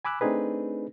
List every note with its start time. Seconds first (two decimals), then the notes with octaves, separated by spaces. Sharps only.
0.05 G#5 B5 D6 E6 F#6
0.21 A3 C4 D4 D#4 G#4 B4